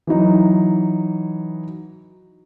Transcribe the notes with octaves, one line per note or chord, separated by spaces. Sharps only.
E3 F#3 D#4